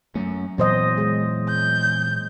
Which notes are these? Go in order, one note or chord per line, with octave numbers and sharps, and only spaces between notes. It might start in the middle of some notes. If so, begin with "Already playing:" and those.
F#2 A3 C#4
E2 A#2 F#3 C5 D#5
G#3
G6